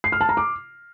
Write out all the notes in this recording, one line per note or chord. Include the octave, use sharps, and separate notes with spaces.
C7
F6
A5
A#5
D6